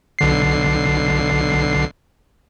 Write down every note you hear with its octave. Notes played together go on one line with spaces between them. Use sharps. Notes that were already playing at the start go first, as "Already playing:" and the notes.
B1 D3 C7